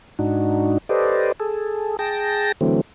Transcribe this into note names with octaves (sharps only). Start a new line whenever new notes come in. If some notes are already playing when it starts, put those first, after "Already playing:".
G#2 D4 D#4 F#4
G4 A4 B4 C5 D5 D#5
G#4 A4
G#4 G5 A5 A#6
D3 E3 F#3 A3 C4